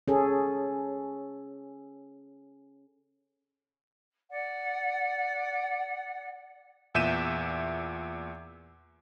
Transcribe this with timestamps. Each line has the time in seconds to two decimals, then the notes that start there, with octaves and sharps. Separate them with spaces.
0.08 C#4 G#4 A4
4.30 D5 F#5
6.95 E2 A#2 E5 G6 D#7 E7